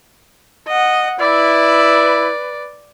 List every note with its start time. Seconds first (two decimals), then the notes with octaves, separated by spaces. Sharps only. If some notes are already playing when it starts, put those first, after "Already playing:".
0.68 D#5 F#5
1.20 E4 B4 D5